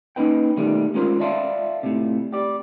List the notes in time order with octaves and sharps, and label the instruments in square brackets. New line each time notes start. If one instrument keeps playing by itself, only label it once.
[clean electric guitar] A#3 C#4 D#4 B4 G5
B2 D#3 G3 A3
G#3 C#4 F4 A#4 C5
C#5 D5 E5 F5 A5 C6
A2 C3
G4 D5